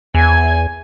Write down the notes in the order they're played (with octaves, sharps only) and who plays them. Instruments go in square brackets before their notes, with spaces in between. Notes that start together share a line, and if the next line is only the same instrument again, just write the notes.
[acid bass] E2 [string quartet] G#5 G#6